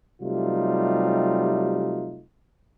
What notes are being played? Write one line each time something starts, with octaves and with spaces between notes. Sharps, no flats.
C3 F#3 G3 A3 D#4 F4